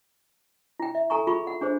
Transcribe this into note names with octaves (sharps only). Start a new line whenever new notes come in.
E4 G5
E5
A4 G#5 A#5 C#6
F4 G#4 B5 C#6
F#5
D4 G#4 C5